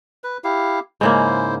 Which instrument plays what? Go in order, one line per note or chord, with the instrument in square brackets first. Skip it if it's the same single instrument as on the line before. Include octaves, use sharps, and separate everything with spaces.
[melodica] B4
E4 G4 F5
[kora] G#2 C#3 A#3 [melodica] E4 C5